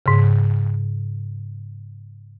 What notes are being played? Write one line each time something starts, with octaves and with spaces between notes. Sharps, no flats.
G#2 C#3